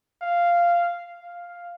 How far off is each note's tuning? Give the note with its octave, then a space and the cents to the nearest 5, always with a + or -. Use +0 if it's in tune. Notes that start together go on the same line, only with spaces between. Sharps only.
F5 -10
F5 +0